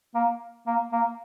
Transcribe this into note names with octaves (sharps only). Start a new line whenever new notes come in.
A#3
A#3
A#3